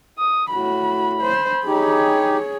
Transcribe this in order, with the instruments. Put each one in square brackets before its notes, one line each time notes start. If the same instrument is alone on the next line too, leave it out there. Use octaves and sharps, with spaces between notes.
[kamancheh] D#6
[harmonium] A2 [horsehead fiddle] F#4 [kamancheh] B5
[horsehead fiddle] C5
[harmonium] D#4 G4 [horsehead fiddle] G#4 C#5